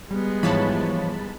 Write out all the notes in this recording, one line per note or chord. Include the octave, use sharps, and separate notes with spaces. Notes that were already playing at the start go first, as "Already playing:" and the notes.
G3 G#3 B3
G#2 E3 F3 C#5 A5 B5